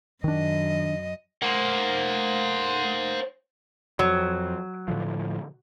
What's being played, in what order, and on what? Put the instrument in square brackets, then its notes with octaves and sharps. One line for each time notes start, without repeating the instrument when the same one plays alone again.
[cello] F#2 D#5 [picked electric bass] D#3 D4
[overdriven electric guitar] A#3 [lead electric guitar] C5 F#5
[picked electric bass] F2 [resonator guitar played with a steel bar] F#3
[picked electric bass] A2 D3 F3